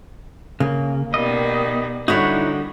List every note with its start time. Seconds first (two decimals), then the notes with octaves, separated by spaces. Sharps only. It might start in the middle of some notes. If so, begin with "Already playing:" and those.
0.60 C#3 A#3
1.14 B2 D#3 G3 D#5
2.08 D3 G3 D#4 E4 F#4 C#5